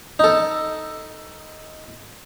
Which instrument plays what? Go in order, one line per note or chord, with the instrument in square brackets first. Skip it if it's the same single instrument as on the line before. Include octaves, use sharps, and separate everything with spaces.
[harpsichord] D#4 A4